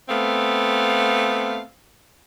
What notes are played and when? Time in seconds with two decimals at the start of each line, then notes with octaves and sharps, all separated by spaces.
0.09 A3 B3 C4 F5